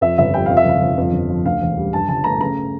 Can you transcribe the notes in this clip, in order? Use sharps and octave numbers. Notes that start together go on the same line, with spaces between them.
F2 E5
G1 E5
G3 G5
F2 F5
E5
G1 F5
G1
F2
G1
F3
D2 F5
E1
G3
G2 A5
G1 A5
A3 A#5
C#3 A#5